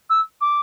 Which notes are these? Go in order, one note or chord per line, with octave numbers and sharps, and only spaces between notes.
E6
D6